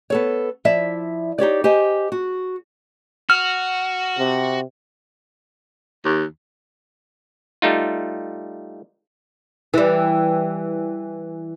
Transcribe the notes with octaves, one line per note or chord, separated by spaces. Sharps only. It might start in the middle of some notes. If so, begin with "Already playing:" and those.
B3 A4 C#5
F3 E4 D5 E5
D#4 G4 C#5 D5
G4 C5 D#5 G#5
F#4
F#4 F6
C3
D#2
G3 A3 D#4 F4
E3 G3